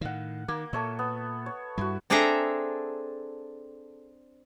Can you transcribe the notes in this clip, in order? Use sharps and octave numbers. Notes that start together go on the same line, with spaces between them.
A2 D#3 F5 F#5
D#3 A#3
A#2 A4 C#5 E5
B3
C#5
G2 G3 E4 F#4
C4 D4 G#4 A4 E5 A#5